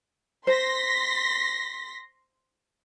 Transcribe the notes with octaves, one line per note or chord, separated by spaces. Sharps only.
C5 C6 A#6 B6